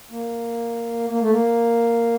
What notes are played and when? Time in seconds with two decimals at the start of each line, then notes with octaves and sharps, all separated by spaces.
0.11 A#3
1.10 A#3
1.21 A3
1.31 A#3